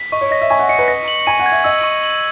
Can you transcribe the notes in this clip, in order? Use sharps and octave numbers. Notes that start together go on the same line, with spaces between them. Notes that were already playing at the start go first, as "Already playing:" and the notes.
Already playing: B6
D#5 C#6
C#5
D#5 A#6
E5
G#5 C#6
F#5
D#5 C#7
B4
D#5 A#6
F#7
G#5 D#7
F#5
G#6
E5
D#5 E6
C#6
F#7